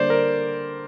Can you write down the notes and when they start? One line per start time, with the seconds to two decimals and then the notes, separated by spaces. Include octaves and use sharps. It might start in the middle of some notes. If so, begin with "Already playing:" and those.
Already playing: D3 G3 A#3 C5 D5
0.10 A#4